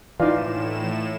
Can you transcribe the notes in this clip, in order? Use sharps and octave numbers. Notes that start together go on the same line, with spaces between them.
A2 E3 A#3 D#4 F4 D5 F5 E7